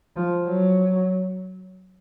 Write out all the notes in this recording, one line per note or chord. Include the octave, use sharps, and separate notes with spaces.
F3
F#3